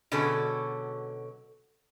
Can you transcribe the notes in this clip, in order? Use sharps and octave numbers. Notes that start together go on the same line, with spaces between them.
B2 D3 F#3 C#4 G#4 A4